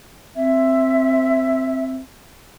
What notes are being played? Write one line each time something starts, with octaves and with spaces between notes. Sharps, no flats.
C4 E5